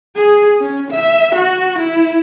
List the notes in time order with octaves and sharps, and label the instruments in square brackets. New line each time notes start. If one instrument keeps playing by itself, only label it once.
[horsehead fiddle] G#4
C#4
E5
F#4
E4